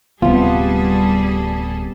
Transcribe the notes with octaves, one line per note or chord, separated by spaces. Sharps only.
D1 C3 G3 B3 C4 F4 G#4 A4